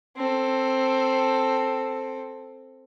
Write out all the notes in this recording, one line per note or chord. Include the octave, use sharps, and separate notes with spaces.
C4 A4